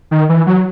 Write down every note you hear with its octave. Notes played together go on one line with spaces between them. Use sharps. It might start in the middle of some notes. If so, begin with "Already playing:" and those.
D#3
E3
F#3